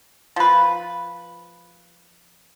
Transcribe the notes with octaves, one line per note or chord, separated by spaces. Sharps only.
F3 B4